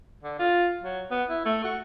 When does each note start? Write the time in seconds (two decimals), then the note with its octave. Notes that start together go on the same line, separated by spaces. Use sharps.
0.23 D3
0.39 F4
0.83 F#3
1.11 B3
1.29 E4
1.46 A3
1.64 F#4